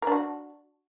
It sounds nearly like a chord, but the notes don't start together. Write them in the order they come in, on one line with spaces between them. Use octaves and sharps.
A#4 D4 F#4